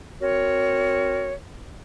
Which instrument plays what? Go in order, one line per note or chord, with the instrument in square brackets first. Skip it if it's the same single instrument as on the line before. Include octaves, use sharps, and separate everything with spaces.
[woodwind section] C4 F#4 A#4 C#5